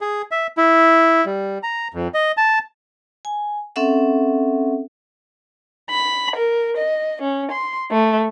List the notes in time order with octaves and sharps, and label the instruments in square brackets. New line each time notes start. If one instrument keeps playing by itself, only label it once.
[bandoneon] G#4
E5
E4
G3
A#5
F2
D#5
A5
[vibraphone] G#5
C4 C#4 A4 E5 F#5
[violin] B5
A#4
D#5
C#4
C6
A3